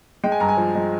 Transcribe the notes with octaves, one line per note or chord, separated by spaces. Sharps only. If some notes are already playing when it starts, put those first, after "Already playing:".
G#3 G5
G#5
G2 A#5
G#5
F3
G#3